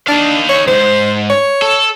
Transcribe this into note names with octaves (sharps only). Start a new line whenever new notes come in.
D4 D#4 F5
C#5
D#2 G#2 C5
C#5
A4